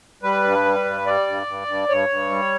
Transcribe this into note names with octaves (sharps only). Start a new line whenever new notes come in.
G3 B4
G2
G3
G2
G3 D5
G2
G2
G2
G2 C#5
G2
G3